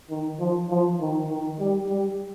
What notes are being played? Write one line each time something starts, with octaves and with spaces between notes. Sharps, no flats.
D#3
F3
F3
D#3
D#3
G3
G3